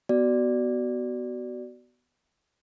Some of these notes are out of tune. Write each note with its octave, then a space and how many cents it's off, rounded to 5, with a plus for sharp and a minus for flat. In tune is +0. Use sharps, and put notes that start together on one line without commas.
B3 +0 F#4 +25 D5 +0